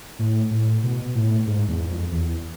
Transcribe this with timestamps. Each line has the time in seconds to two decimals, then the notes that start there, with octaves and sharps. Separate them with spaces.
0.19 A2
0.51 A2
0.83 B2
1.15 A2
1.47 G#2
1.68 E2
1.90 F2
2.12 E2